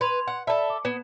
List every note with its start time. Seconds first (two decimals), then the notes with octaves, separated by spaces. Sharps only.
0.01 B4 C6 G#6 F7
0.27 F#5
0.47 A4 D5 E5 A5 B5
0.70 D6
0.85 B3 G#6 E7